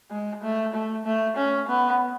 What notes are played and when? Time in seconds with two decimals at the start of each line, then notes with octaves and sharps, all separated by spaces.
0.11 G#3
0.43 A3
0.73 A3
1.05 A3
1.37 C#4
1.68 B3